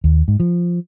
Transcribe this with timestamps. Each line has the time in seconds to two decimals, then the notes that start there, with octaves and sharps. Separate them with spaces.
0.04 D#2
0.28 G#2
0.40 F3